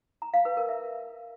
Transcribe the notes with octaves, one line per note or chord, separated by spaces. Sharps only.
A#5
F5
B4
A#4
E5